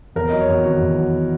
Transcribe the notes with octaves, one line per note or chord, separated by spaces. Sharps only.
E2 A#4
F#3 D#5
C#5
E2 F#4
D#3 F#4
E2
F#3